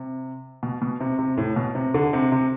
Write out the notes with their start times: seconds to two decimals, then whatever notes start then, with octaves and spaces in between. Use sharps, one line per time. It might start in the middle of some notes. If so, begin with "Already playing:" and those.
Already playing: C3
0.63 B2
0.82 B2
1.00 C3
1.19 C3
1.37 A2
1.56 B2
1.75 C3
1.94 D3
2.13 C3
2.32 C3